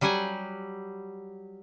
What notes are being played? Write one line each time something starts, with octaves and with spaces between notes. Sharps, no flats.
F#3 G3 G4 F#5 G#5